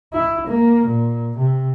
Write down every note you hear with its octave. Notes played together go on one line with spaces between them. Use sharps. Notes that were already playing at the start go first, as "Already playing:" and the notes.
E4
A#3
A#2
C3